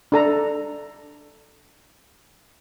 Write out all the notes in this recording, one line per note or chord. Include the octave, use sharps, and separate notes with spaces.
D4 A4 A#5